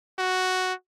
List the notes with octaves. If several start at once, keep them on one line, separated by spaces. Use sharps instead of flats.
F#4